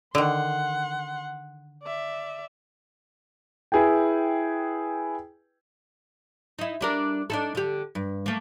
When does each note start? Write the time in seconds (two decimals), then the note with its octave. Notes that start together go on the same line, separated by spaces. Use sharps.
0.15 D3 D#3 F#5 C6
1.83 D5 E5
3.72 E4 G#4 B4 G5
6.59 D#4 E4
6.81 G3 D4 A#4
7.30 D4 D#4 A4
7.55 D3 G4
7.95 G2
8.26 A3 A#3